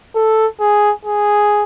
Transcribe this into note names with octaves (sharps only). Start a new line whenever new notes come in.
A4
G#4
G#4